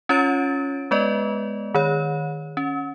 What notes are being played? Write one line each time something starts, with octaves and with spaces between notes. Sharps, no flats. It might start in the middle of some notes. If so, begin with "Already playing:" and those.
C#4 F4 C#5 A6 D7
G#3 B3 B4 D5 D#5
D#3 C#5
C#4